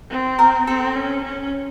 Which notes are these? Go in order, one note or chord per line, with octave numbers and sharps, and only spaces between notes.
C4
A#4
C4 A4
C#4
C#4